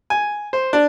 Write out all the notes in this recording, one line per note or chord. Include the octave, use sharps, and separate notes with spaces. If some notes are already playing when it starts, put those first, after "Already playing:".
G#5
C5
D4